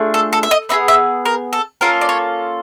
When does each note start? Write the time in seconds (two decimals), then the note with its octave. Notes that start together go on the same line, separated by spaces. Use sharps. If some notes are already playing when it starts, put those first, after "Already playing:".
Already playing: A3 D4 F4 G#4
0.14 A4
0.33 A4
0.43 E5
0.51 D#5
0.69 B3 D#4 G#4 E5
0.88 E5
1.25 A#4
1.53 A4
1.81 A#3 C#4 F4 A4 A#4
2.01 D5
2.09 C#5